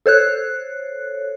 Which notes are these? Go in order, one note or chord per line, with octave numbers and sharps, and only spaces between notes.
A4 C5 C#5 F#6